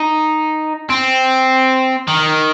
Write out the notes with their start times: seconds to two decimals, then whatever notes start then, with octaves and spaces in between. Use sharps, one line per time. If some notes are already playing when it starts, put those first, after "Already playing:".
Already playing: D#4
0.90 C4
2.08 D#3